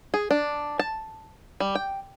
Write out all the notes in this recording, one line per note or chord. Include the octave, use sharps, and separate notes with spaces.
G#4
D4
A5
G3
G5